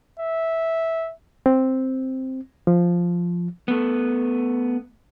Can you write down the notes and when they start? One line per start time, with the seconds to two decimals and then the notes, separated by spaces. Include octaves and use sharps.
0.19 E5
1.46 C4
2.67 F3
3.68 A3 B3